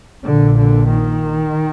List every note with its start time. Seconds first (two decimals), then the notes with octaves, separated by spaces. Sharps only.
0.24 A#1 A#2 D3
0.55 D3
0.87 D#3